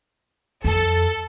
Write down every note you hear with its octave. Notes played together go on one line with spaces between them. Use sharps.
F2 A4